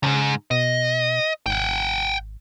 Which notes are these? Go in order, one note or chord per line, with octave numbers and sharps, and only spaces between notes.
D2 G#2 C#3
B2 D#5
G#1 F#5 G5